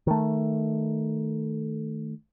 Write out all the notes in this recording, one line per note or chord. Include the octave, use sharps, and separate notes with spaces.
D#3 A3